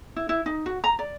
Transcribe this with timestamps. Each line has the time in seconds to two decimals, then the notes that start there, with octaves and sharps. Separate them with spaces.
0.16 E4
0.29 E4
0.46 D#4
0.66 F#4
0.84 A#5
0.99 D5